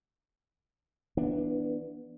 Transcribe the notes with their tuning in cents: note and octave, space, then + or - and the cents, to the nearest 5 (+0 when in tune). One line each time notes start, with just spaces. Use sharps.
E3 +0 B3 -20 D4 +10